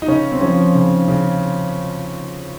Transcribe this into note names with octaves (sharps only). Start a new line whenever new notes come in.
D#4
C#3 C#4
C4
F3 C#4
C#3
C#3